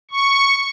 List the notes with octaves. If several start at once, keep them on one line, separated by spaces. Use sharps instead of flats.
C#6